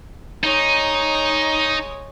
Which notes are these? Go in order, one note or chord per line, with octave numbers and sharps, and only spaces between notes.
G#3 D#4 C#5